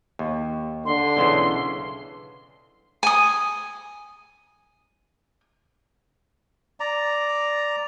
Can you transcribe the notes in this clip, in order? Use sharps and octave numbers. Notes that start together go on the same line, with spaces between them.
D#2
D3 C6
B1 C#3 E3
G#5 D#6
D5 A#5